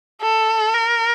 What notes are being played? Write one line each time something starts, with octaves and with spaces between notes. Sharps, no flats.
A4
A#4